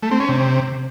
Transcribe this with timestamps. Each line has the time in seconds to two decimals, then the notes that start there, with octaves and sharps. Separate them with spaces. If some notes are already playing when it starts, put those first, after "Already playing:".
0.03 A3
0.11 C4
0.20 C#4
0.29 C3